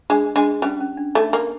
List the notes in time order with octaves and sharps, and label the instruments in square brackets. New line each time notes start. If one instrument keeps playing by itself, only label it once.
[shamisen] G#3 [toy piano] D4
[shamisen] G#3 [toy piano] D4
[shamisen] G3 [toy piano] C#4
[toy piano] C#4
D4
[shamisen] A3 [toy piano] D#4
[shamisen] A#3